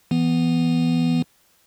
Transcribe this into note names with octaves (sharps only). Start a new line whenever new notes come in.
E3 B3